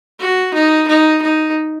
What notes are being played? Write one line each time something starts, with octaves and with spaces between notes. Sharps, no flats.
F#4
D#4
D#4
D#4